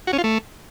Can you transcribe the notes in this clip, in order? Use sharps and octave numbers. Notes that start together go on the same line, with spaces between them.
F#4
C#4
F4
A3